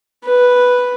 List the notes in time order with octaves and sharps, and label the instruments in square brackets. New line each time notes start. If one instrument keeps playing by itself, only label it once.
[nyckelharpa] B4